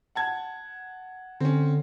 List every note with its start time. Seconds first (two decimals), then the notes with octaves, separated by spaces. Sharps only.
0.15 F#5 A5 G#6
1.40 D3 C4 C#4